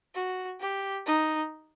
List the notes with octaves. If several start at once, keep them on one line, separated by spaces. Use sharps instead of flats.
F#4
G4
D#4